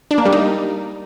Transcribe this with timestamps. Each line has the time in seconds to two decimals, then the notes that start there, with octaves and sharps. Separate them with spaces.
0.11 D4
0.18 A#3
0.25 G3
0.33 D#4